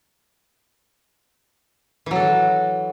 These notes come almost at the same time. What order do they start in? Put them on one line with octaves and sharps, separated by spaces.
E3 F#3 A4 F#4